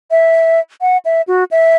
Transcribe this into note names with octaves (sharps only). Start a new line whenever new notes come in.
E5
F#5
E5
F#4
E5